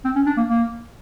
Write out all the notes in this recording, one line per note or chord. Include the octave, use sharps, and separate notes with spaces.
C4
C#4
D4
A#3
A#3